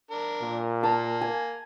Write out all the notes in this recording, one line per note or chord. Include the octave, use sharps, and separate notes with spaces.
D4 A#4
A#2
A#3 A5
G#5